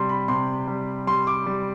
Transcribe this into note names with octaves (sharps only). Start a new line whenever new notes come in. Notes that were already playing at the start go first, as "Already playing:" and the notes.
Already playing: C3 G3 C6
B5
C3 C6
G3
G3 C6
D6
G3